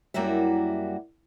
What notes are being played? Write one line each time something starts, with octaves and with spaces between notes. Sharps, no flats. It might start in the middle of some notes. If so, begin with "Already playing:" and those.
F#2 G3 A#3 E4 F#4 E5